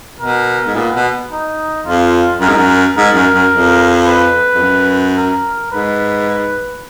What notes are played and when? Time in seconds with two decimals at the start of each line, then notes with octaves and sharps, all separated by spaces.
0.21 B2 A#4
0.67 G#2
0.75 A#2 B3
0.95 B2
1.31 D#4
1.86 F2 F4
2.41 F#2 A#4
2.49 G#2
2.57 F#2
2.96 G#2 A#4
3.14 F#2
3.34 F#2
3.52 F2
4.06 B4
4.55 F2
4.62 F#2
5.17 A#4
5.72 G#2 B4